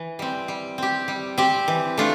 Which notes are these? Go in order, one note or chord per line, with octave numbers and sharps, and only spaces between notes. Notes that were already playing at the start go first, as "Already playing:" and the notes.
Already playing: E3
G3 C4
G3
C4 G4
G3
C4 G4
E3
A3 D4 F4